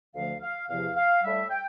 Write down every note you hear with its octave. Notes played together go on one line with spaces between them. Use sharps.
D2 D3 F3 A3 F5
F5
E2 C3 F3 F5
F5
A2 G3 E5
G5